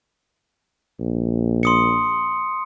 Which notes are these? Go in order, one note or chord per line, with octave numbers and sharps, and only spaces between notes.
A#1
C6 D#6 C#7